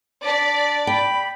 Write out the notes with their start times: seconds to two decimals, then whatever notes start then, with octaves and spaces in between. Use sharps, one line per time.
0.25 D4 D5 B6
0.87 G5 B5